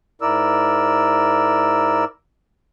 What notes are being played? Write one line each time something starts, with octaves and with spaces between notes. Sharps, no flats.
G#2 E4 A#4 D5 E6